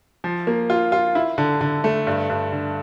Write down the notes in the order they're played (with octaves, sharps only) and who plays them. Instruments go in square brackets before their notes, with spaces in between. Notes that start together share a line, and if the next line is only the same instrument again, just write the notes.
[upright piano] F3
A#3
F4
F4
E4
D3
D3
A3
G2
G2
D3